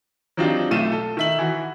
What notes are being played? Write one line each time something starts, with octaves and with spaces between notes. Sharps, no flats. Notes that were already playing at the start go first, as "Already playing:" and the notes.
F#3 C4 D4 D#4 F4 G4
B1 A3 F4 D#7 E7
A4
D#3 E5 F#7
E3 F#4